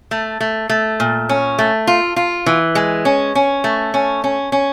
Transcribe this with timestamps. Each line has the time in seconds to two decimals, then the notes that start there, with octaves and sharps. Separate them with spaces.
0.11 A3
0.41 A3
0.70 A3
1.00 A#2
1.29 C#4
1.59 A3
1.87 F4
2.16 F4
2.46 E3
2.75 G#3
3.05 C#4
3.35 C#4
3.64 A3
3.94 C#4
4.24 C#4
4.52 C#4